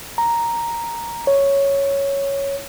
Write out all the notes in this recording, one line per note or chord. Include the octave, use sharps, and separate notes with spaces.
A#5
C#5